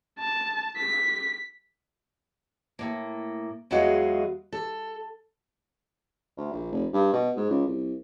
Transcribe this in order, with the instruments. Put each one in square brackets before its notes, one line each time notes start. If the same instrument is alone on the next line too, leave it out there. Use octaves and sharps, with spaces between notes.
[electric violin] A5
B6
[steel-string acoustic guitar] A2 A#3
E2 F#3 G#3 F4 F#4 D#5
A4
[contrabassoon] D2
A#1
F1
G2
B2
G#2
C#2
C2